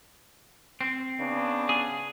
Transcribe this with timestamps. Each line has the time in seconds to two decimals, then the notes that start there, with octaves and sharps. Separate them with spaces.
0.81 C4
1.19 C#3 B3 D4
1.69 G#4